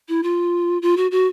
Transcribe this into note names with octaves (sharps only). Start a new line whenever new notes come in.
E4
F4
F4
F#4
F#4